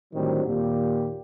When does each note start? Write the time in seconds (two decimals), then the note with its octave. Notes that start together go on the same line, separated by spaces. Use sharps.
0.14 A2 D3 D#3 F#3 G3 C4
0.46 D#2 A#2 G4